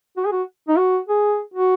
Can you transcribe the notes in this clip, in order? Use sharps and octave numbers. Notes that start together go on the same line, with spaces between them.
F#4
G#4
F#4
D#4
F#4
G#4
F#4